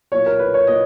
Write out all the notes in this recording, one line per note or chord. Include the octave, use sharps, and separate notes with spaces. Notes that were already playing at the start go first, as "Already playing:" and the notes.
B1 A#2 A#3 C#5
A#4
B4
C#5
A#2 A#3 D#5